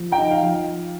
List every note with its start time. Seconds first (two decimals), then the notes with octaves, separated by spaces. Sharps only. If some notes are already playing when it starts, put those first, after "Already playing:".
Already playing: F3
0.12 G5 A#5
0.18 D#4
0.31 F5
0.43 F3